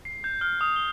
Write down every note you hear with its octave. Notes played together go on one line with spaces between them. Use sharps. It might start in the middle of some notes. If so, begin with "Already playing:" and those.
C7
G6
F6
D#6
G7